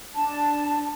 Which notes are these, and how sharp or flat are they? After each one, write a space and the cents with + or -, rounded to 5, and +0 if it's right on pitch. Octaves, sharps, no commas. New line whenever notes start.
D4 +0 A5 +0